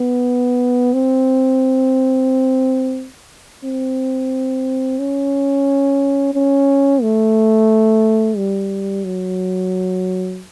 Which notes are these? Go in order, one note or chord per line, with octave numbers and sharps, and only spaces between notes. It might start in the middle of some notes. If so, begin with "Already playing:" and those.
Already playing: B3
C4
C4
C#4
C#4
A3
G3
F#3